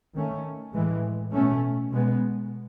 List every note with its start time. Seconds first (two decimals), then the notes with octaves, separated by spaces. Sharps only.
0.14 D#3 A3 C#4
0.73 A2 E3 G#3
1.32 B2 A3 C#4
1.91 B2 G#3 B3